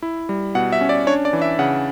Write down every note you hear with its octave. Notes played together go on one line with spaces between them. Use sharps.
E4
G3
B2 F#5
E5
C#4
D5
D4 C#5
D5
E3
E5
C#3 F#5